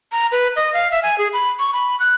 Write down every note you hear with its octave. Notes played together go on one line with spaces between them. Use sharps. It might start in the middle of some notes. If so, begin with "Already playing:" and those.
A#5
B4
D#5
F5
E5
G#5
G#4
B5
C#6
B5
F#6